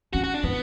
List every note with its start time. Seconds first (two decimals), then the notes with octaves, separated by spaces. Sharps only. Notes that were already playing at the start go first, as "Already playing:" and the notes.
0.13 C#4 F#4
0.24 F#4
0.34 D4
0.43 B3 E4